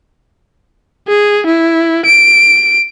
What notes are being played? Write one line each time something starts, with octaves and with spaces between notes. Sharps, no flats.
G#4
E4
D7